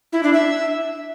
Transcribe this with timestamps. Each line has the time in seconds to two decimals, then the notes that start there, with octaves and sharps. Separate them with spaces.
0.13 E4
0.23 D4
0.33 E5